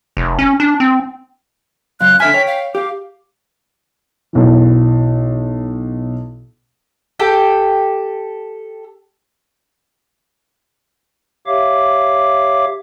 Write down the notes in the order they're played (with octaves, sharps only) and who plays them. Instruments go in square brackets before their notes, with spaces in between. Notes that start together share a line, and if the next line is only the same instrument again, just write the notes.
[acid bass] F1
C#4
D4
C4
[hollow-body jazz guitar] C#2 F#2 [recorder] F5 [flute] F#6
[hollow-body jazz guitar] D3 E5 G#5 [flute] F6 [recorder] B6
[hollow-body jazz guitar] C#5 [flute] G5
[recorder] F5
[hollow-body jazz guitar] G4 [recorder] F5 [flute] D6
[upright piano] B1 E3
[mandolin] G4 A4 G5
[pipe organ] G4 C#5 E5 F5 D6